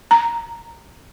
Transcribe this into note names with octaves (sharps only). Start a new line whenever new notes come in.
A#5